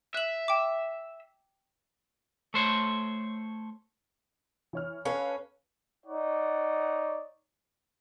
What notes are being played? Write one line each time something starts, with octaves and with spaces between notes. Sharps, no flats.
E5 F#6 F#7
G5 D6
A3 C5 C#5
E3 C#5 F6
C#4 A4 B4 F5
D#4 C#5 D5 F#5